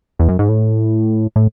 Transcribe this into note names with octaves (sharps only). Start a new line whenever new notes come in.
E2
F#2
G#2
A2
A2